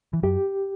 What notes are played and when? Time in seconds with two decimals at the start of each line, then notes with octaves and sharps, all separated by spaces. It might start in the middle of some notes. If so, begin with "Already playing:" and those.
0.13 E3
0.23 F#2 F#3 G4